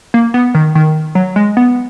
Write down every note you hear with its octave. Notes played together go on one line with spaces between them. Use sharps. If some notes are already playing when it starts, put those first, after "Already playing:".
A#3
B3
D#3
D#3
F#3
G#3
B3